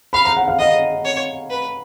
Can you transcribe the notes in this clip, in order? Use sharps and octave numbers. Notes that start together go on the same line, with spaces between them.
F5 B5
A#5
F#5
F5
D#5 F5
C#5
B4